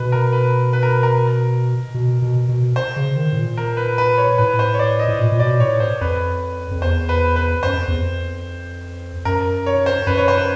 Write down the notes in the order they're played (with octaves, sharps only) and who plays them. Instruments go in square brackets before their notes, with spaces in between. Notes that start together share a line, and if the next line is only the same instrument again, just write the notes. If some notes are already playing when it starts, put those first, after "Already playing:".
Already playing: [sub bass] B2 [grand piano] B4
[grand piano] A#4
B4
B4
A#4
A#4
[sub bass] B2
B2
B2
[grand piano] C5
[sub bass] C#3
D#3
A2
A#2
[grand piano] A#4
B4
B4
C#5
[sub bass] A2 [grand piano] B4
[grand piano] C5
C#5
D5
D#5
[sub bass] A2
A#2
A#2
[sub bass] B2 [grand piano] D5
[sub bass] A2 [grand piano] C#5
[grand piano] C5
[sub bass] F2 [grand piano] B4
[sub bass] F2
[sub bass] E2 [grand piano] C5
[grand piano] B4
B4
[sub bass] F#2 [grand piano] C5
[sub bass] F2
E2
F2
[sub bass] F#2 [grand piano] A#4
[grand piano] C#5
C5
[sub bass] F#2 [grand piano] B4
[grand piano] C#5
C5
B4